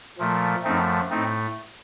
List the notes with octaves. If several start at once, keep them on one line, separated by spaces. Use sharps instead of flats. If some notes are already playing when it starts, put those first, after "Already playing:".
A#2 F3 A3
F#2 F3 A3 C4 D#4
A2 A3 C4 D#4